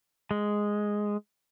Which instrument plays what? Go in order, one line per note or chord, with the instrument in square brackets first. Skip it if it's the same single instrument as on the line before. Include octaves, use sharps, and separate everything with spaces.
[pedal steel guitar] G#3